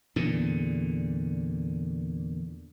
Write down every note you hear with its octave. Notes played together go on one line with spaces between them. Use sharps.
E2 A#2 D3